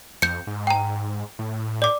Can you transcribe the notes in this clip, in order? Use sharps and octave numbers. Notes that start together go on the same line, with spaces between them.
F2 G6 C#7
G#2
G5 A#5
A2
D5 D6